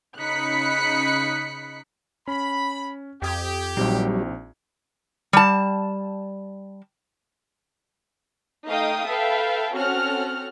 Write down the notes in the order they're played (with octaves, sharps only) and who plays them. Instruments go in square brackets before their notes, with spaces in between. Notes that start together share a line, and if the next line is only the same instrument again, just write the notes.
[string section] C#3 D#4 B5 F#6 B6 C#7
[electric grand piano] C#4 [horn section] B5
[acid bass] F2 [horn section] G4 [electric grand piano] G5 D#6 G#6
[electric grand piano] A#1 C4 D#4 [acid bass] A#2 [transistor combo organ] F#3 G3
[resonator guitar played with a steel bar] G3 A5
[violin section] A3 D#4 D#5 F5 G5 D#6
A4 B4 E5 F5 G5
C4 C#4 F#4 A4 F#5 F6